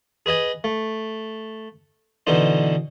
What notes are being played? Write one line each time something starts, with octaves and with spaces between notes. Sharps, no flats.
G#4 B4 D#5 G#5
A3
B2 D3 E3 D#4 C5